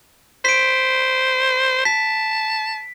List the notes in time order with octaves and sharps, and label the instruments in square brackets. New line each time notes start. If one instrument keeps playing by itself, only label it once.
[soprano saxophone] C5 [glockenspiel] B6 D7
[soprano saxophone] A5 [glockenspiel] B6